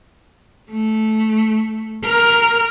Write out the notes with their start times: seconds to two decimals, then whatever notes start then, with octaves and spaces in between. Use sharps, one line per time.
0.70 A3
2.04 A#4